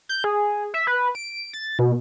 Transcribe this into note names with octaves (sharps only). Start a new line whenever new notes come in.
G6
G#4
E5
B4
D7
A6
B2